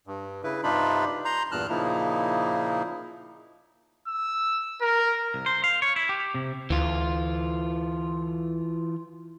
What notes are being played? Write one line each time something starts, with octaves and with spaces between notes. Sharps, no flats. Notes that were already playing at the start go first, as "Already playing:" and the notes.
G2
C#3 E4 B4
G2 C3 D4 D#4 F4 B5
A#5 C6 G6
E2 G2 A#2 A5 F6 F#6
A#2 C#3 F3 A#3 D#4 E4
E6
A#4
C2
C5
F5
C#5
E4
G4
C3
D2 E3 F4